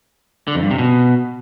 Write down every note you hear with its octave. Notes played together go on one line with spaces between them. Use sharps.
D3
F2
G2
C3
B2